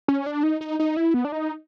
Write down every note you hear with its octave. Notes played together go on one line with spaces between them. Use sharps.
C#4
D4
D#4
D#4
D#4
E4
B3
D4
D#4